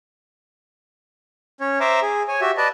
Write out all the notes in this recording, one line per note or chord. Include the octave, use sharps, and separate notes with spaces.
C#4 C#5
C5 E5 A#5 D6
G#4
C#5 G#5
F#4 G4 E5
B4 D5 D#5 A5